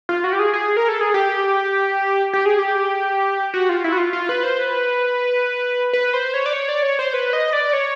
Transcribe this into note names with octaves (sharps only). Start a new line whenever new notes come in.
F4
F#4
G4
G#4
G#4
A#4
A4
G#4
G4
G4
G#4
G4
F#4
F4
E4
F#4
F4
F4
B4
C5
B4
B4
C5
C#5
D5
C#5
D5
C#5
C5
B4
D#5
D5
C#5